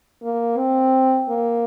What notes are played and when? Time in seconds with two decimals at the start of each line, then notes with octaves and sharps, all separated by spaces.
0.23 A#3
0.58 C4
1.29 A#3